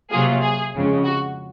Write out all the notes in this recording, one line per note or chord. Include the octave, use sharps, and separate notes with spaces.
C3 F#3 A#3 F4 G#4
G#4
F2 C#3 G#3
F#4